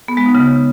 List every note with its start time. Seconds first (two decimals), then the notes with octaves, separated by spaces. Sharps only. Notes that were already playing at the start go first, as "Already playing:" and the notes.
0.08 B3
0.17 G#3
0.26 D#4
0.35 C#3